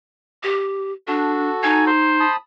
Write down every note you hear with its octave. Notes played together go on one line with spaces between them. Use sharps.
G4
D4 F#4 A4
D#4 G#5
C5
A5 B5 D#6